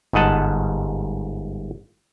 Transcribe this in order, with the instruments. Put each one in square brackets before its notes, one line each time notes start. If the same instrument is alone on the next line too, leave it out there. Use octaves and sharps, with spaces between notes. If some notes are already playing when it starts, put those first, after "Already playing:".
[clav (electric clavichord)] G1 G#2 D#5 F#5 A5